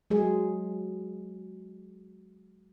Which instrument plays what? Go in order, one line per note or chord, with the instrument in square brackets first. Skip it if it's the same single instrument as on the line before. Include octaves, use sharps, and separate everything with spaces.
[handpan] F#3 G#3 G#4